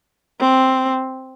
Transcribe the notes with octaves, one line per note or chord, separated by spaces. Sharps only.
C4